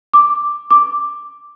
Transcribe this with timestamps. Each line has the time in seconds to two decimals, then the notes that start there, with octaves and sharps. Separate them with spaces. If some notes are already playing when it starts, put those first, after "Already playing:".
0.14 D6
0.71 D6